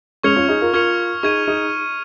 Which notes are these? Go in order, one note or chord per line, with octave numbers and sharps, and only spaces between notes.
G#3 C#4 C#6 F6 G#6 C#7 F7
C#4 F4
D#4 G#4
F4 A#4
F4 A#4 C#6 F6 G#6 C#7 F7
D#4 G#4 C#6 G#6 D#7
D#4 G#4